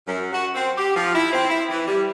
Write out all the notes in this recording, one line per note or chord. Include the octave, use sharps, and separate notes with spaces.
F#2
F#4
C4
G4
F3
E4
C4
E4
E3
G3